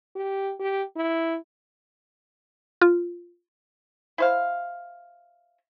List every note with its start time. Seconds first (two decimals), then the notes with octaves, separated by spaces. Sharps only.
0.16 G4
0.59 G4
0.96 E4
2.81 F4
4.18 E4 C5 F5